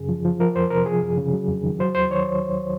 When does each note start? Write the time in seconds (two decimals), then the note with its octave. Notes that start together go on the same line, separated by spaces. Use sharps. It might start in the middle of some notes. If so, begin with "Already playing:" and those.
Already playing: F#2 C#3 G#4
0.09 F3
0.25 F3
0.40 F3 A#4
0.55 F2 C5
0.70 C3 A#4
0.86 F3 G#4
1.02 F#2
1.18 C#3
1.34 F#3
1.48 F2
1.64 D#3
1.79 F#3 C5
1.95 D#2 C5
2.10 D#3 C#5